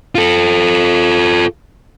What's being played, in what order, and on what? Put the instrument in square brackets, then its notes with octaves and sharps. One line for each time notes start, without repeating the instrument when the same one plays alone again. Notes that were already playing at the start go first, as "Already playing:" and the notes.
[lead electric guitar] F4 A4